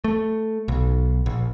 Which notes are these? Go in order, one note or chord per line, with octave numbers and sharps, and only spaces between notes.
A3
B1
A#1